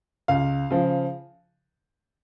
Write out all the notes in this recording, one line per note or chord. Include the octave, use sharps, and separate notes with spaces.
C#2 F5
C#3 F3